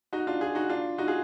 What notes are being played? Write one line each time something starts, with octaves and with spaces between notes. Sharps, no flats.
D#4 F#4
D4 F4
F4 G#4
D#4 F#4
D4 F4
D#4 F#4
F4 G#4